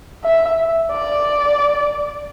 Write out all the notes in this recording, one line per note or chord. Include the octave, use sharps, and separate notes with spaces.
E5
D5